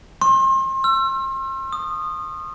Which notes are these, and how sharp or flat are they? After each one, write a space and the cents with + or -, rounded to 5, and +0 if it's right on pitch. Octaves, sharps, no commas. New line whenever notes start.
C6 +35
E6 +35
D#6 -15